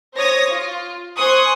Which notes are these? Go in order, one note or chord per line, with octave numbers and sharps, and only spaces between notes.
C5 C#5 D#6 A#6
F4
C5 G#5 C6 C#6 D#6 F#6